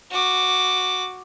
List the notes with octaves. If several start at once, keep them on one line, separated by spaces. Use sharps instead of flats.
F#4 D6